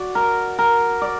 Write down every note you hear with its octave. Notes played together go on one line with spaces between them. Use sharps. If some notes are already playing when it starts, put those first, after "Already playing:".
Already playing: F#4 D5
A#4
A#4
D5